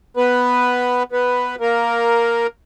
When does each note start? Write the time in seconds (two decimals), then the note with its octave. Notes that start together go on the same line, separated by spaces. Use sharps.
0.17 B3 B4
1.12 B3 B4
1.60 A#3 A#4